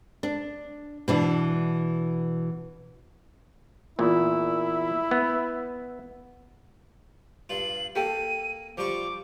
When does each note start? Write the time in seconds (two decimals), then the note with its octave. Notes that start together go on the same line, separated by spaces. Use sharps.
0.23 D4
1.08 B2 E3 D4
3.99 E2 A#2 E4
5.11 B3
7.49 G2 F4 F#7
7.95 A#3 G4 A4 G5 D#7
8.77 F3 G3 C#6 D6